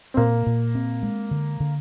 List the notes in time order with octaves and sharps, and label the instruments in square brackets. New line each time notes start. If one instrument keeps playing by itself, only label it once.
[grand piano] C4
[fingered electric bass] A#2 [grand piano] A#3
[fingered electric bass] A#2
C4
G#3
D3
D3